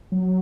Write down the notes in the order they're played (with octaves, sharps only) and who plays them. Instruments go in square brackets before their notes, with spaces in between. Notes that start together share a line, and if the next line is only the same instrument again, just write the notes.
[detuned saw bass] F#3